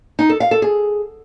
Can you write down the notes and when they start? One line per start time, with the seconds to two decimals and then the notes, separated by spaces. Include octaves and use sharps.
0.19 D#4
0.30 A4
0.40 F5
0.51 A4
0.62 G#4